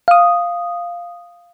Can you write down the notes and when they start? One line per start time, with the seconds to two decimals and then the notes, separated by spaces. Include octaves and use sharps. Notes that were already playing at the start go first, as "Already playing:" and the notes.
0.08 F5 D#6